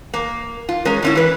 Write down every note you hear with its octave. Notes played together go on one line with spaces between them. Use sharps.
A#3
F4
G#3 C#4 A#4
D3 C#4 E4
E3 B4